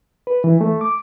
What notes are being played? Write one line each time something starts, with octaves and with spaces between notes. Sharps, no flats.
B4
E3
A3
D6